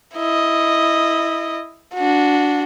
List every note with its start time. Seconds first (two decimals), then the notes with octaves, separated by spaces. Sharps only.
0.15 E4 D#5
1.95 D4 F#4